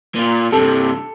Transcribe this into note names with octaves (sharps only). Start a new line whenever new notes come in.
A#2 F4
G2 C3 A4